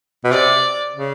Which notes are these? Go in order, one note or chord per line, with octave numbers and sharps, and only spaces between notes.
B2
C3 D5
C#3